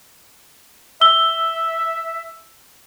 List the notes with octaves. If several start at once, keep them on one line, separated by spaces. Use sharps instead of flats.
E5 E6 G7